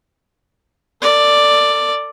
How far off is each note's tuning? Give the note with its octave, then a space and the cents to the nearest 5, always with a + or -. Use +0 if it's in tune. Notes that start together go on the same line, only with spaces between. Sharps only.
A4 +35 D5 +5